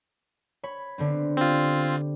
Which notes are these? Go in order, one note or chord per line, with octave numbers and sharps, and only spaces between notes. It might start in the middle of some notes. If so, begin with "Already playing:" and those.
C#5 B5
D3 B3 C4
C4 F4 G4